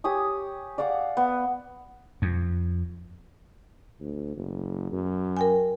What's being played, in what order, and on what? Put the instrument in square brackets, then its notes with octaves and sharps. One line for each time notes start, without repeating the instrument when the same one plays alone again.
[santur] G4 C#5 G#5 D#6
D5 F5 F#5 D6
B3
[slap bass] F2
[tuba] D2
F#1
F#2
[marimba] A#4 G5 G#5